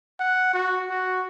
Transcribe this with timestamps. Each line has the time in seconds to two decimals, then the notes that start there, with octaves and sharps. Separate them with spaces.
0.20 F#5
0.53 F#4
0.89 F#4